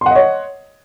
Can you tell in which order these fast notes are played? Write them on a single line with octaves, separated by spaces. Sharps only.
C6 F#5 D#5 C#5